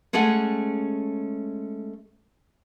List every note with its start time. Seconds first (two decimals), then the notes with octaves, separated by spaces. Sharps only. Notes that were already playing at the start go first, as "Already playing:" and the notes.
0.13 G#3 A3 C#4 G#4 A4 F#5